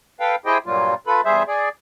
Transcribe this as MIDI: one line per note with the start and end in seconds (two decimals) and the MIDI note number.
0.20 0.36 69
0.20 0.36 71
0.20 0.36 77
0.20 0.36 79
0.46 0.58 64
0.46 0.58 67
0.46 0.58 68
0.46 0.58 72
0.46 0.58 75
0.46 0.58 79
0.66 0.94 43
0.66 0.94 46
0.66 0.94 54
0.66 0.94 55
0.66 0.94 58
0.66 0.94 65
1.07 1.21 65
1.07 1.21 69
1.07 1.21 71
1.07 1.21 83
1.25 1.43 40
1.25 1.43 55
1.25 1.43 68
1.25 1.43 72
1.25 1.43 76
1.47 1.69 68
1.47 1.69 74